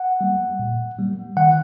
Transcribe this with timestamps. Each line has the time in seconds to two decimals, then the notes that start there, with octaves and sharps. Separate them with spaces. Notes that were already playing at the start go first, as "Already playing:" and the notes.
Already playing: F#5
0.21 G3 A#3
0.59 A#2
0.98 G3 A#3
1.37 D#3 F#5